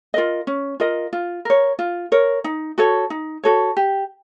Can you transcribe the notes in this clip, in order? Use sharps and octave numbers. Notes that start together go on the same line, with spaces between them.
F4 A#4 D#5
C#4
F4 A#4 D#5
F4
A#4 C#5
F4
A#4 C#5
D#4
F#4 A4 C#5
D#4
F#4 A4 C#5
G4